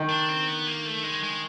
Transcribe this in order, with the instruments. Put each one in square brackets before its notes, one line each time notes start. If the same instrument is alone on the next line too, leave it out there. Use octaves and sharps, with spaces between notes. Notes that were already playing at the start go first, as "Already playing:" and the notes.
Already playing: [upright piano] D#3
[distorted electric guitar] D4
C4
B3
A#3
A3
G#3
G#3